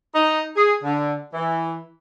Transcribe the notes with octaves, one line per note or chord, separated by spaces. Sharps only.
D#4
G#4
D3
E3